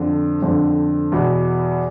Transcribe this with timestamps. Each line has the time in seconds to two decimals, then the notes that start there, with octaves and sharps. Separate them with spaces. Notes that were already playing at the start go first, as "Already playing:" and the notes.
Already playing: F2 D3
0.42 F2 D3
1.12 E2 B2